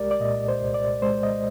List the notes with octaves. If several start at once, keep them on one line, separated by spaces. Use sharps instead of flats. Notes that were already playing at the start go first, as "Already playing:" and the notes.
Already playing: C2 G#3 G4 A#4 D5
D5
A#2 D#5
C5
C2
D5
G#3 C5
D#5